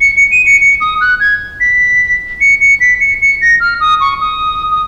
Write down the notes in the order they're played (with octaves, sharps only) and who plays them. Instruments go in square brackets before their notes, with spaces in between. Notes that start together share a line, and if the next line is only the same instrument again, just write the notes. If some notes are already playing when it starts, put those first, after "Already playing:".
[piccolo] C#7
C#7
D#7
C#7
C#7
D#6
F#6
G#6
B6
C#7
C#7
B6
C#7
C#7
A#6
F6
D#6
C#6
D#6
D#6